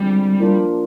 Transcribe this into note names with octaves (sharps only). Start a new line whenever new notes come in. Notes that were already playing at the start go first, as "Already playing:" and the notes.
Already playing: D3 G3 G#3 C4 F4
F3 A#3 D4 F4